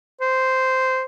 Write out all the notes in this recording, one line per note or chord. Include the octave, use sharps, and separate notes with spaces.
C5